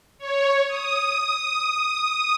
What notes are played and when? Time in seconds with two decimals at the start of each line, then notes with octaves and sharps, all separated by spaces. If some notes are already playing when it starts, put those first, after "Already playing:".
0.19 C#5
0.68 D#6